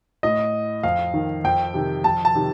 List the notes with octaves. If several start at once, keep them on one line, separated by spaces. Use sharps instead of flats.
A2 D#5
F2 F5
D#3
F2 G5
C3 D#3
F2 A5
A5
C3 D#3